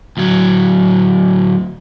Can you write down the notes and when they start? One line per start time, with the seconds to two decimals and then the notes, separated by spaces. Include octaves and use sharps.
0.17 D2 F#3